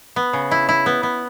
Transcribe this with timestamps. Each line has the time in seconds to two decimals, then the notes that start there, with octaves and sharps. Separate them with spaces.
0.16 B3
0.33 C#3
0.51 E4
0.69 E4
0.86 B3
1.03 B3